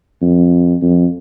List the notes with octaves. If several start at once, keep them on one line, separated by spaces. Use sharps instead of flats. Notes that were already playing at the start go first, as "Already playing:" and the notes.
F2
F2